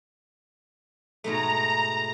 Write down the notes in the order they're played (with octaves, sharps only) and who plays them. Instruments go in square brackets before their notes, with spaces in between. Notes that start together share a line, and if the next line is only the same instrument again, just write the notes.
[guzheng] G#2 B2 A3 [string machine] A#5